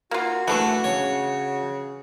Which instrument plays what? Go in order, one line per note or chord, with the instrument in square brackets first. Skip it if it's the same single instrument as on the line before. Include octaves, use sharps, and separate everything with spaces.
[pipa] A#3 F4 [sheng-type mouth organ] F#4
[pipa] E3 D4 C#6 [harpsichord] A3 A4 F#5
[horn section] C#3 [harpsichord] C#5